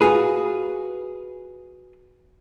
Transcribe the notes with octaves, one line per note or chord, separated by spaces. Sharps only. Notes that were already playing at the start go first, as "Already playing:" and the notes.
F4 F#4 G#4 B4